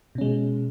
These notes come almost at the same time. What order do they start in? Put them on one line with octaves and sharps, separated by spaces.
B2 C#4 G#3